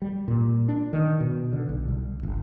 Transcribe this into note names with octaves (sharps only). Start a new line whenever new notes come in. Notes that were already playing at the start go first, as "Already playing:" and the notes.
G3
A#2
D4
D#3
B2
D3
B1
C2
G1